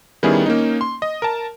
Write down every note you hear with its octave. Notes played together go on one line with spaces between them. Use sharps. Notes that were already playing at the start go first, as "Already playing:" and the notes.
D#3 G3 B3 C#4 E4 G#4
A#3 C#4 D#4
C6
D#5
A#4 A5